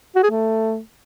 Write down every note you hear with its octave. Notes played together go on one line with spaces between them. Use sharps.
F#4
G#4
A3